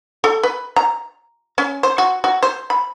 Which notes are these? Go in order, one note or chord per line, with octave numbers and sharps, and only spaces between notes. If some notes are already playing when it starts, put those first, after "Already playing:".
A4
B4
A#5
C#4
C5
F#4
F#4
C5
B5